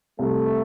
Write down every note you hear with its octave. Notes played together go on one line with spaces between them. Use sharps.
C2 A3